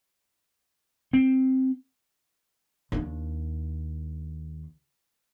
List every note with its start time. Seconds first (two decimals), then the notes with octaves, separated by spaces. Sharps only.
1.13 C4
2.92 D#2 D4